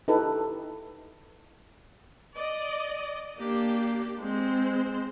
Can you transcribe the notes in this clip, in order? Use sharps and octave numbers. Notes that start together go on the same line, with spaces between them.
D#4 E4 G4 A4 B4
D5 D#5
A#3 D4 G4
G#3 C4 C5